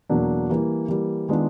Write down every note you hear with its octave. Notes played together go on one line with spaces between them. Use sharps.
E2 B2 F#3 A#3 D4
E3 G3 A#3
E3 G3 A#3
D#3 G#3 B3 D4 F4